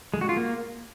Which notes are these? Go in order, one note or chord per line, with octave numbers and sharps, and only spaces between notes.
G#3
F#4
F4
A#3